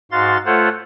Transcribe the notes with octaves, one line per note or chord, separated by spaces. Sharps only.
G#2 F#4 F5 C6 A6
A3 F4 A4 C5 C#5 F#5